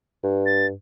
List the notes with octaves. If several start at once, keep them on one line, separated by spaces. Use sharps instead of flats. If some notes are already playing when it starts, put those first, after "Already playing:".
G2
A6